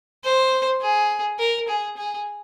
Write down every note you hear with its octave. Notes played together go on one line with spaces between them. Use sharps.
C5
G#4
A#4
G#4
G#4